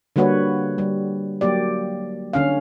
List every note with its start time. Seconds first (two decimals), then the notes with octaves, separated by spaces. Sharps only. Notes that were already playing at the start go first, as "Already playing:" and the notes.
0.16 D3 G3 A#3 F#4 B4 C#5
0.78 G3
1.41 F#3 A#3 G4 D5
2.33 D3 C#4 F5